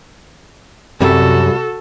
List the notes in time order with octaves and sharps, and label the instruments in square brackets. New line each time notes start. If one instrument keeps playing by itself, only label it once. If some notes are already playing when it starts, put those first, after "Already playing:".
[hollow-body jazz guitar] C2 G3 E5 [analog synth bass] F#2 [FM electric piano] C3 [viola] F#4 A4